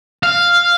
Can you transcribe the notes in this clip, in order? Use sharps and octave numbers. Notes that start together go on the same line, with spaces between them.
F5